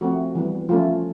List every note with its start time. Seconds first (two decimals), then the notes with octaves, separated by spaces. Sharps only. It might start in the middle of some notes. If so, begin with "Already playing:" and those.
0.01 F3 A3 C4 F#4
0.35 E3 G3 B3
0.69 F3 A3 C#4 F4